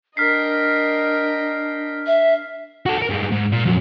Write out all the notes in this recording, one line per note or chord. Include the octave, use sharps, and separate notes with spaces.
D4 A#4 D#5 G5 F6 B6 C7
E5
F#4 A4
A4 A#4
G2 G#3
G#2
A#2
F2 F#3